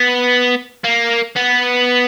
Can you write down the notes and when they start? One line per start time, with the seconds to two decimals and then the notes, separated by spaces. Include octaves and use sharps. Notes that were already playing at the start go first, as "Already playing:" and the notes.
Already playing: B3
0.84 A#3
1.36 B3